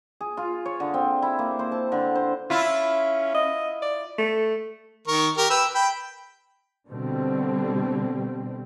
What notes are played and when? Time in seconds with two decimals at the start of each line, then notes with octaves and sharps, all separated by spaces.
0.21 G#4
0.37 F4
0.65 C#5
0.80 D3
0.94 C4
1.22 E4
1.39 A#3
1.59 C5
1.72 A5
1.92 D3
2.15 C5
2.50 C#4 E4 F4
3.35 D#5
3.82 D5
4.18 A3
5.08 D#3 A#4 C#6
5.37 G4 A#4
5.50 B4 G5 E6
5.75 G5 B5
6.87 B2 D3 G3 C4